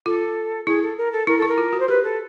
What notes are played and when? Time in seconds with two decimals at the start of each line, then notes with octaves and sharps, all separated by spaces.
0.06 F4 A4
0.66 E4 G#4
0.82 A4
0.97 A#4
1.12 A4
1.27 E4 A#4
1.38 E4 A4
1.48 A#4
1.58 F4
1.73 F#4
1.80 C5
1.88 G4 B4
2.03 A4